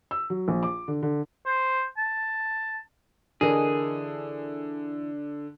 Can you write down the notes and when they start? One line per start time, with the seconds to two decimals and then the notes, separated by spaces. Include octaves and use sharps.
0.11 E6
0.30 F#3
0.48 A#1
0.63 D6
0.88 D3
1.03 D3
1.46 C5
1.98 A5
3.41 D3 E3 G#4 A#4 D#5